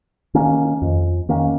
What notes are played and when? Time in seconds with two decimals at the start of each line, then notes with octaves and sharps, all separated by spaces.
0.34 D#3 A#3 C#4
0.82 F2
1.29 D#3 A#3 C#4